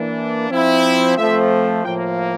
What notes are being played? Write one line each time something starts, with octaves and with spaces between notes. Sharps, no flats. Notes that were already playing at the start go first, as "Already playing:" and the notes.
Already playing: E3 A#3 D4
F3 C4 E4
F3 A3 C4 E5
A2 F3 A#3 G5